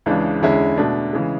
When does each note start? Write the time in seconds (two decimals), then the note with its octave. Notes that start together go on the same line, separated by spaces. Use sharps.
0.06 C#2 C#3 E3 G#3 D4
0.42 E2 D3 G#3 C#4 E4
0.78 B2 A3 D4
1.13 C#3 E3 G#3